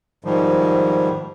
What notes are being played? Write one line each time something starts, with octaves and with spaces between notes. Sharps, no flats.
G#2 D#3 F3 G3